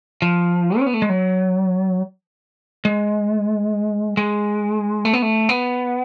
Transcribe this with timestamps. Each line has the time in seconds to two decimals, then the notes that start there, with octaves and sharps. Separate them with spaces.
0.22 F3
0.79 C#4
0.86 B3
0.94 A3
1.02 G#3
1.09 F#3
2.85 G#3
4.17 G#3
5.05 A3
5.13 B3
5.22 A3
5.49 B3